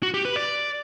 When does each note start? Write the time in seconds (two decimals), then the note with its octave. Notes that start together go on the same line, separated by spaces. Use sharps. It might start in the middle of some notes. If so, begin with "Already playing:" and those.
0.03 F#4
0.14 G4
0.25 B4
0.36 D5